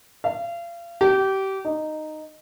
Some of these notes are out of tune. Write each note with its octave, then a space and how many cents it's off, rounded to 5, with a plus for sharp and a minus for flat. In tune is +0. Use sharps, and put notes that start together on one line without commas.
F5 -35
G4 -25
D#4 -10